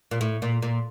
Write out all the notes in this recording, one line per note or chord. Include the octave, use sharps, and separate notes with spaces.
A#2
A2
A#2
A#2